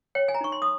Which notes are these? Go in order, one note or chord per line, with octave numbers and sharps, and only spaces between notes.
C#5 G5
G#5
A#5
D#4 C#6
C6
D#6